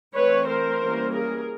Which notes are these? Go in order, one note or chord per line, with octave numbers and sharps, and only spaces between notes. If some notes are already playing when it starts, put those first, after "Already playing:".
E3 A3 C4 B4 C#5
A#4 C5
E3 G3 A#3 C#4
G#4 A#4